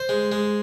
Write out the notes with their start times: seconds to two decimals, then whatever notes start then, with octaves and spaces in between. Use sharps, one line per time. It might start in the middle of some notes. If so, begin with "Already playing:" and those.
Already playing: C5
0.09 G#3
0.32 G#3